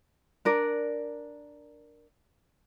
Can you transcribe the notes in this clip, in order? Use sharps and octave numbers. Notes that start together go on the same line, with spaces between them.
D4 A#4 D5